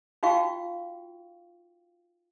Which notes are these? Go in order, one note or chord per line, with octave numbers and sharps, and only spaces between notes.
D#4 F4 F#4 F5 G5 C#6